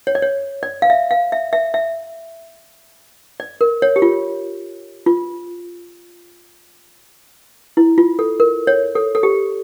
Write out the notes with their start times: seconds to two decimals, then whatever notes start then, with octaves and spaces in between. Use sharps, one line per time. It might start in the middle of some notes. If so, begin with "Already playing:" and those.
0.07 C#5
0.15 D5
0.22 C#5
0.63 D5
0.82 F5
0.90 E5
1.11 F5
1.32 E5
1.53 E5
1.74 E5
3.40 D5
3.61 A#4
3.82 C#5
3.96 G4
4.02 F4
5.06 F4
7.77 E4
7.98 F4
8.19 A4
8.40 A#4
8.67 C#5
8.95 A4
9.15 A4
9.23 G4